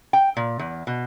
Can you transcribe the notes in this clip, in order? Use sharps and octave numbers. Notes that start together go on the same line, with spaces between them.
G5
A#2
E2
B2